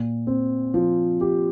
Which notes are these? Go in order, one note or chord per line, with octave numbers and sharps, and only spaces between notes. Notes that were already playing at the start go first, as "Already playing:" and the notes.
Already playing: A#2
C4
F3
G4